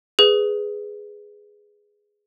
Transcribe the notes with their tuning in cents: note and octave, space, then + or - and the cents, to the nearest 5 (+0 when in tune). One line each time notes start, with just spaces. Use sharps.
G#4 +0 B4 +10